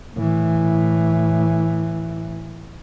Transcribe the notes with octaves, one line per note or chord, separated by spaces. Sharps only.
A2 E3